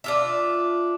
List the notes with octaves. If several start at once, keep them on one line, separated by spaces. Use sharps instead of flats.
D4 F4 E5